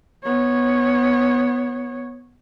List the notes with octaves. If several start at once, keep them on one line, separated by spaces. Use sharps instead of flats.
B3 C#5